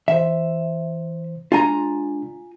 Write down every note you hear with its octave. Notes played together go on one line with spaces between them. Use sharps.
E3 C5 E5
G#3 D4 F4 G#5 A#5